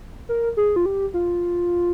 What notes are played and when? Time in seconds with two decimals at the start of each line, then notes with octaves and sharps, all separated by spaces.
0.29 A#4
0.57 G#4
0.76 F4
0.86 G4
1.14 F4